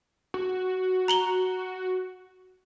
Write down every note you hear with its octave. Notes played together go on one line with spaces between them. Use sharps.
F#4
A#5 F#7 G7